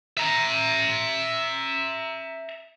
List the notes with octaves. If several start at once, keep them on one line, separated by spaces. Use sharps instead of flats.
E5 A#5